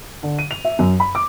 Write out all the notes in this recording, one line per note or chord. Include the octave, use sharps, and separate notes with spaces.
D3
D#7
F7
E5
F#2
B5
D6